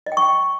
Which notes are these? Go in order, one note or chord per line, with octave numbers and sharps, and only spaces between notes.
D#5
G5
C#6
G5